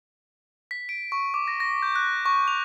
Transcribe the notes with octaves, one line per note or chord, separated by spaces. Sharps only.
B6
D7
C#6
D6
A#6
A#6
G6
F#6
C#6
F7